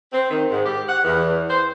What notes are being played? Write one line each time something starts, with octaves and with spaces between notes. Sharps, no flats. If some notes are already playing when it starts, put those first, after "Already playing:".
C4
D#3
G#2
G4
F#5
E2
C5